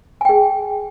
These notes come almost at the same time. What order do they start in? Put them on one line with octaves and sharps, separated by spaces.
G#5 G5 G#4